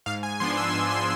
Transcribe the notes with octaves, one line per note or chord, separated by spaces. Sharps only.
G#2 F5
G#5
F3 B3 D4 C6
E6
G#2
C6